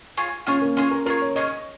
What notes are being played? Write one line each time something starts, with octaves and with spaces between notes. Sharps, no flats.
F4 G#4 C#5
C#4 F4 G#4 C#5
A#3
C#4 F4 G#4 C#5
A#4
F4 G#4 A#4 C#5
C#5
C#4 F4 G#4 C#5 D#5